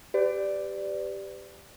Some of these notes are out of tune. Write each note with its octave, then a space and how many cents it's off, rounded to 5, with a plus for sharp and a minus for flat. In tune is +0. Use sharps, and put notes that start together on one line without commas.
G4 +0 B4 +40 D5 +5